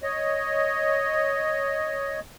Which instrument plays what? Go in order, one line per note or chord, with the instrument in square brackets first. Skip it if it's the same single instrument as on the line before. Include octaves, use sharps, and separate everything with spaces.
[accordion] C#5 D#5